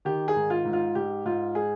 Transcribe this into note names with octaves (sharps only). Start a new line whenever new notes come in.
D#3 G4
G#4
G#2
F4
G#2
F4
G#2 G4
G#2 F4
G#3 G#4